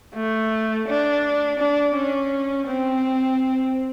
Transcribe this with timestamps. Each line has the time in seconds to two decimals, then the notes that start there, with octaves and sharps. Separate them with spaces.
0.15 A3
0.88 D4
1.59 D4
1.95 C#4
2.67 C4